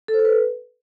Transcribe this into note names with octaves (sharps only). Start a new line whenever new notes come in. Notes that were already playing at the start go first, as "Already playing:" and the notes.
A4
C5
A4
B4